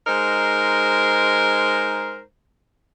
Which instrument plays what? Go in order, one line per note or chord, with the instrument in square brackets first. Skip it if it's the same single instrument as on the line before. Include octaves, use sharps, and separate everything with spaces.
[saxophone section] G#3 D#4 A#4 C5